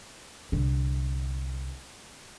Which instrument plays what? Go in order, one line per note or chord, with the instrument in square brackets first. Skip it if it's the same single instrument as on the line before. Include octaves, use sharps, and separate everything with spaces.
[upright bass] C2 D3